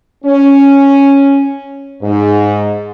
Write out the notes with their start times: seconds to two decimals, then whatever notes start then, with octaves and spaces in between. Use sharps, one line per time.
0.24 C#4
2.02 G#2